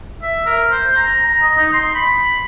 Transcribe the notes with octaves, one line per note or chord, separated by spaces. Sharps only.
E5
A#4
C5
A#5
A#5
D#5
D#4
C6
B5